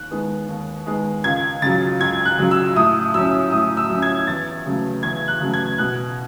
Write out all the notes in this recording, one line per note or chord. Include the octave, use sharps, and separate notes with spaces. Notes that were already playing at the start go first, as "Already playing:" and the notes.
Already playing: D#2 F#6
D#3 G#3 B3
D#2
D#3 G#3 B3
C#2 G#6
C#3 F#3 A6
C#2 G#6
F#6
C#3 F#3
E6
A2 D#6
F#3 C#4 E6
A2 D#6
E6
F#3
C#4
G#6
E2 A6
C#3 F#3 A3
E2 G#6
F#6
C#3 F#3 A3
G#6
B2 F#6